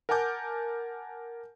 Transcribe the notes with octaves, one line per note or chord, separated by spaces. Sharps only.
A#4 F#5 G#5 A5 D6 G6